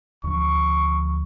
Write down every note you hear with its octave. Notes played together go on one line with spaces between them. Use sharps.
D2 F3 C#6